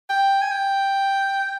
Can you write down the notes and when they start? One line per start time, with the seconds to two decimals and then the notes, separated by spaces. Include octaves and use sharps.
0.09 G5
0.42 G#5
0.51 G5